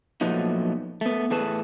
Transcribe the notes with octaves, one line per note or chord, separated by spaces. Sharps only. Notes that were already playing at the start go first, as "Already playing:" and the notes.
A#2 F3 F#3 A3 B3 D#4
A3 B3
E2 A2 A3 G#4 B4 A5